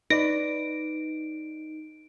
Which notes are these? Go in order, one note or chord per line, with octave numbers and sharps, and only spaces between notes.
D#4 B4 D5 A#6 D7